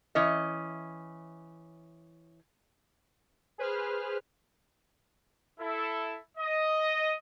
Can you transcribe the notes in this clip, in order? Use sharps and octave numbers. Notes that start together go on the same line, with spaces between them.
E3 C#4 D#5
G#4 B4 C5 F6
E4 A4
D#5